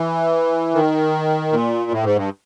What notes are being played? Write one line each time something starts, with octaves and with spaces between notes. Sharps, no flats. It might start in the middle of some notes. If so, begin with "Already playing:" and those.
Already playing: E3
D#3
A#2
A2
G#2
G2